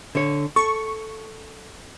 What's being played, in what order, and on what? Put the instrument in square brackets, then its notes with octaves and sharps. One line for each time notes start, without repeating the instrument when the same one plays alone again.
[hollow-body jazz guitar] D3 C#5
[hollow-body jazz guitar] A4 [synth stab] C#6